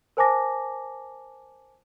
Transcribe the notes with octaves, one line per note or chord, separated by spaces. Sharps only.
A#4 C5 G#5 A5 D6 A#6